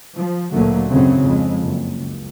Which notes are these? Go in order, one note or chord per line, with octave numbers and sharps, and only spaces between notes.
F3
D2 A#2 D3 F#3 A3 A#3
G#1 F#2 C#3 F#3 C4
F2 G#3
F#1
C#2